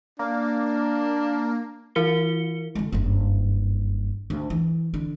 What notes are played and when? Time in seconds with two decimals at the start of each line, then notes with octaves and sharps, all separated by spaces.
0.19 A#3 D4
1.95 E3 E4 A#4 C#7 G7
2.75 D3 G#3
2.92 F#1 G2
4.30 D2
4.50 E3
4.94 D3